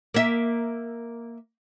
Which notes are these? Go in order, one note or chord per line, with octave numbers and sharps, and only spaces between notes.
A#3 E5